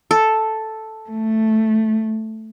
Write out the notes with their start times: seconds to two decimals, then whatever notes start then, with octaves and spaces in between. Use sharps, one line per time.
0.11 A4
1.10 A3